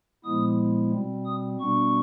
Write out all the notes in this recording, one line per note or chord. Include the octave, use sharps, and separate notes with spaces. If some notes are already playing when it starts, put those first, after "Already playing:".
A#2 F3 G#3 B3 E4 D#6
B2 G3 C4
D#6
B2 G3 B3 D4 C#6